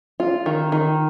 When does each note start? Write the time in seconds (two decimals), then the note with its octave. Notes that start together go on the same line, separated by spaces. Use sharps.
0.20 F4
0.46 D#3
0.72 D#3